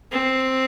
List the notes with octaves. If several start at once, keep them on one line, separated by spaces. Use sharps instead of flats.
C4